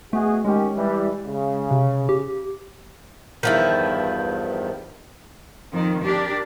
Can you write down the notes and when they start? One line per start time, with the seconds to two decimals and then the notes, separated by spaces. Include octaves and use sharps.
0.13 B2 A3 F#4 G#4
0.45 D#3 G#3 C#4 G4
0.75 E3 G3
1.26 C#3
1.71 C3
2.09 G4
3.43 E2 G2 D#3 F3 E4
5.72 F2 D#3
6.04 D4 G4 A#4